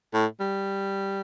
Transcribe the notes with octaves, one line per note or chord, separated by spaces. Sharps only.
A2
G3